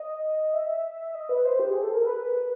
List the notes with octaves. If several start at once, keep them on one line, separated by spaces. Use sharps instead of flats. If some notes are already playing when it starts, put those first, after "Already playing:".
Already playing: D#5
E5
D#5
B4
C5
G4
G#4
A4
A#4
B4